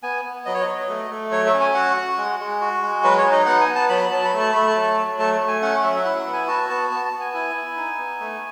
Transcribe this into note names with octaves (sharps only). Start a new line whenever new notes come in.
B3 G#5
B3
F#3 D#5
C#5
D#5
F#3
A3
A3
F#3 C#5
E5
C#4
G#5
F#4 F#5
F#4
G#3
G#3
F#4
G#3
F#3 B4
C#5
D#4
D#5
B3 F#5
G#5
B3
A5
F#3 B5
F#3 A5
B5
A3
A5
A3 B5
A5
F#3
F#3
A3 A5
A3
G#5
C#4 F#5
F#5
F#3 E5
E5
E4 F#5
F#5
B3
G#5
F#4 A5
B3 A5
B3 A5
A5
B3
G#5
E4 G#5
E4
D#4
B3
A3